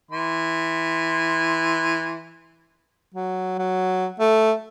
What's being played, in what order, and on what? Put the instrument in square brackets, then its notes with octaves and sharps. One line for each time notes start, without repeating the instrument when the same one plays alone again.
[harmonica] E3 C6
[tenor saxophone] F#3
F#3
A3